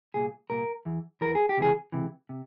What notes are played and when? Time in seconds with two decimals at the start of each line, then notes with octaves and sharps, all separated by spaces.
0.14 C2 A#2 G#4
0.50 C2 A#2 A#4
0.85 E2 E3
1.21 E2 E3 A#4
1.35 G#4
1.49 G4
1.57 C#2 C3 E3 G#4
1.92 C#2 C3 E3
2.29 C3